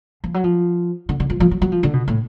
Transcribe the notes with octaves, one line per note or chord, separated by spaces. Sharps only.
F3
F#3
F3
D3
D3
F3
F3
F#3
F#3
F3
D3
B2
A2